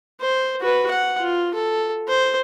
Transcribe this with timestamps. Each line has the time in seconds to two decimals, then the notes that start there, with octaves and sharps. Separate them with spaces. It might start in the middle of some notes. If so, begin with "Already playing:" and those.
0.21 C5
0.61 F#4 B4
0.91 F#5
1.20 F4
1.54 A4
2.08 C5